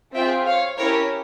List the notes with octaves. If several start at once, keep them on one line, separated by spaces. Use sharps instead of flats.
C4 F4 G#4 E5 G5
C#5 F5
C#4 E4 G4 A#4 C#5